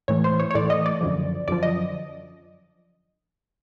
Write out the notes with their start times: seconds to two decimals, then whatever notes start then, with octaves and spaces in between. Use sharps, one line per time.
0.08 A2 E3 A3 C#5
0.24 C5
0.40 C#5
0.51 C#5
0.54 A2 E3 A3 D5
0.70 D#5
0.86 D5
1.01 F#2 D3 F3
1.48 F#2 D3 F3 D5
1.63 D#5